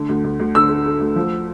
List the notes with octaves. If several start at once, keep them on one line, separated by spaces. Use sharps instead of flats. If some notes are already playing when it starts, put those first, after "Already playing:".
Already playing: D3 A3
D2
D2
D2
D3 E6
A3
A3
D2
F3